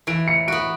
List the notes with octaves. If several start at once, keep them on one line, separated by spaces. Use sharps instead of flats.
E3 D7
C#7
B3 F#4 D7